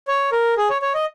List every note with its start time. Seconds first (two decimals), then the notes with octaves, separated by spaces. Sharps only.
0.08 C#5
0.32 A#4
0.57 G#4
0.70 C#5
0.82 C#5
0.94 D#5